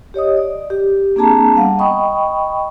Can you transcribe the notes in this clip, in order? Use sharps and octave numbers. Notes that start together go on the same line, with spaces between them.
G4 C#5 D#5 D#6
D5
G4
A#3 C4 D4 G#4 A5 A#5
G3 B3 F5 F#5
D#5 G5 B5 C#6 D#6